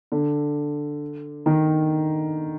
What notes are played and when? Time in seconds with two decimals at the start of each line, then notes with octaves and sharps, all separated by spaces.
0.12 D3
1.46 D#3